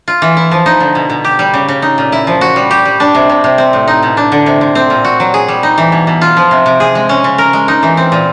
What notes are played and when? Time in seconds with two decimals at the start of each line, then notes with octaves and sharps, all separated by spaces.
0.08 F4
0.22 E3
0.37 E4
0.51 F3
0.66 D#4
0.80 D3
0.95 B2
1.09 B2
1.24 G4
1.39 G3
1.54 C#3
1.68 C#3
1.82 D#4
1.98 A#2
2.12 E4
2.27 F3
2.41 F#4
2.56 G3
2.71 G4
2.85 G3
3.00 D4
3.14 C3
3.29 C3
3.44 C3
3.58 C4
3.73 A2
3.88 D#4
4.03 B2
4.17 D4
4.32 D3
4.46 C3
4.61 C3
4.75 C4
4.90 A#2
5.04 F#4
5.20 F#3
5.34 G#4
5.48 G3
5.63 D#4
5.78 E3
5.92 B2
6.07 B2
6.21 F4
6.37 F3
6.51 C3
6.66 C3
6.80 G#4
6.95 G#3
7.09 C#4
7.24 C#3
7.38 A#4
7.53 G#3
7.68 D#4
7.82 E3
7.97 C4
8.12 A#2